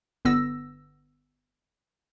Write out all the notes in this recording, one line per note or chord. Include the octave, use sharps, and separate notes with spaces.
G1 D3 B3 E6 A#6